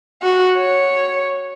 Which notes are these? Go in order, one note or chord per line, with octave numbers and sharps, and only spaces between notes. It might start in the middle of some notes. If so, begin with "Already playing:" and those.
F#4
C#5